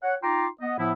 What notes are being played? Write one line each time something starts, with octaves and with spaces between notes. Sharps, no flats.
C#5 F#5
D#4 F4 G5 A#5 C6 D6
B3 D#5
A2 F3 B3 E4